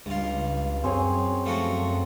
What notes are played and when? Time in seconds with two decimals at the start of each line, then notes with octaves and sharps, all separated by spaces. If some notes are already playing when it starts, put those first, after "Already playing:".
0.06 C#2 G2 F4
0.84 F#2 C4 G#4 C#5
1.46 F3 A3 F#4